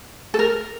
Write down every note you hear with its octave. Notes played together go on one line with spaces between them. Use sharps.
A4
A#4